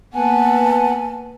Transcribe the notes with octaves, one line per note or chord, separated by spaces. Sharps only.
A#3 B3 B4 F#5 G#5 A5